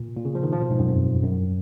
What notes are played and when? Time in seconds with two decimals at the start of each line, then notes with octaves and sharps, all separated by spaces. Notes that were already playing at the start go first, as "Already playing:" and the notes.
Already playing: A#2
0.16 A#2
0.25 C#3
0.35 F3
0.43 D#3
0.53 F3
0.62 B2
0.71 G#2
0.79 F#2
0.88 F2
1.24 F#2